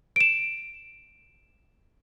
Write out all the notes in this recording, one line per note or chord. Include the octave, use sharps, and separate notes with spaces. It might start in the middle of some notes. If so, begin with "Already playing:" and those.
D7 E7